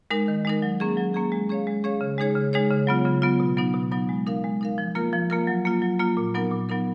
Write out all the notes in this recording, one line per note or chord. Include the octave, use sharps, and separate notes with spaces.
G#3 D#4 A#4
D#3
G#3 D#4 A#4
F#3
A#3 C#4 G#4
F#3
A#3 C#4 G#4
G#3
C#4 G#4 C#5 F5
G#3
C#4 G#4 C#5 F5
C#3
G#3 D#4 G#4 C#5
C#3
G#3 D#4 G#4 C#5
C#3
F#3 B3 F4
C#3
F#3 B3 F4
B2
F#3 B3 D#4
B2
F#3 B3 D#4
G#3
D#4 A#4 F5
G#3
D#4 A#4 F5
F3
A#3 F4 A#4
F3
A#3 F4 A#4
F#3
A#3 F4
F#3
A#3 F4
A#2
F#3 B3 D#4 A#4
A#2
F#3 B3 D#4 A#4